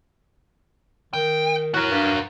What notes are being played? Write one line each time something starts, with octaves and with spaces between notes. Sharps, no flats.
D#3 G5
A2 F#4 A#4
G2